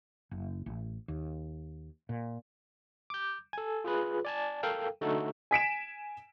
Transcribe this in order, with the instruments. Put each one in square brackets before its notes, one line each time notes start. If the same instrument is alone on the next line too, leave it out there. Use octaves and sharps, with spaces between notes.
[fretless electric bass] F#1
A1
D#2
A#2
[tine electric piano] D6 G6
A4 G#5
F4 G#4 B4
D5 G#5 A5
A4 A#4 F5 G5
D3 A3 D#4 F#4 A4
[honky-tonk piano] G#5 B6 D7 E7